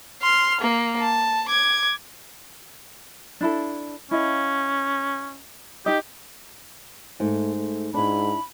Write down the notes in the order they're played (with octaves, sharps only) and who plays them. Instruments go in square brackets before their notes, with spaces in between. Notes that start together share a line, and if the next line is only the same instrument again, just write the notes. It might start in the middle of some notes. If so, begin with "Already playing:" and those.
[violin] C6 F6
A#3
A5
D6 G#6
[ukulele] D4 E4 A4
[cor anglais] C#4 [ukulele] E4 D#5 F5
[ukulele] D#4 D#5 [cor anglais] G4
[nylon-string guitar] G#2 [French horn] A3
[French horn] A3
[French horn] G#2 [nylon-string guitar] D4 E4 [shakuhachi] B5